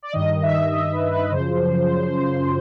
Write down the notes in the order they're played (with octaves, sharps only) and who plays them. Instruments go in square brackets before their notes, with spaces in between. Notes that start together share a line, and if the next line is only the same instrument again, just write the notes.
[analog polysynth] D5
G2 D#3 D#5
E5
D#5
B4
B4
F#2 C#3 F3 C5